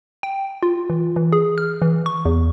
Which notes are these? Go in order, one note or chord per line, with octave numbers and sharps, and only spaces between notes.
G5
F4
E3
E3
G#4
F6
E3
C#6
E2